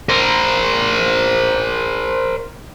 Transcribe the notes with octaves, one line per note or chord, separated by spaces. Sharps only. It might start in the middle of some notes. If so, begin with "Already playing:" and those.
A#4 C5